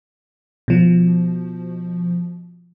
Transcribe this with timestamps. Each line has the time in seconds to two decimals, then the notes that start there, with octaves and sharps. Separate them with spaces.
0.68 B2 F3